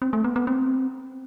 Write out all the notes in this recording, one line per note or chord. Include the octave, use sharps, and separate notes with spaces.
C4
A3
B3
B3
C4